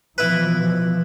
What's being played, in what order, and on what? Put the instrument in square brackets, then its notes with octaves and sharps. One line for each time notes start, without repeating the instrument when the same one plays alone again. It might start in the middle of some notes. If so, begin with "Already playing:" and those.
[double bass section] B2 E3 F3 [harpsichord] E4 B4